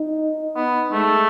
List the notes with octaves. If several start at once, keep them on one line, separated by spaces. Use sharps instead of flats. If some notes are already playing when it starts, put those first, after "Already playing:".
Already playing: D#4
B3
G#3 A3